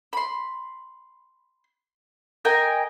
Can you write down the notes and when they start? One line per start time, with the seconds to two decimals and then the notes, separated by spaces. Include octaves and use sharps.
0.13 B5 C6
2.45 A#4 D#5 G5 G#5